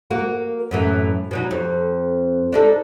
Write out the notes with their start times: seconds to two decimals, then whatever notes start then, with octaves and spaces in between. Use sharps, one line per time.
0.10 A#3 F#4 A#4
0.71 F#2 A2 E3
1.31 B2 F#3 D#4
1.51 F2
2.52 D4 D#4 A4